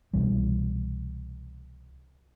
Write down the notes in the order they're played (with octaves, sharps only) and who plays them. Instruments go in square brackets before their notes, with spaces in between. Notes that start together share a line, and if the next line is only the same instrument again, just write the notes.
[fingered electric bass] C2 B2 E3 G3